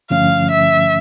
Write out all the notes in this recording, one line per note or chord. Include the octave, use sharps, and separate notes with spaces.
G2 D3 F3 A3 C#4 F5
E5